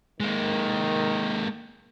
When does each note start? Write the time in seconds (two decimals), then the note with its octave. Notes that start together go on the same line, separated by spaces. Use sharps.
0.20 D#3 G#3 A#3